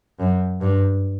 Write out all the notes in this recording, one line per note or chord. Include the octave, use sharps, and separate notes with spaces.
F#2
G2